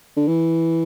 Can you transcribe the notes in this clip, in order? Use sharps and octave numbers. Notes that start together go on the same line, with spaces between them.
D3
E3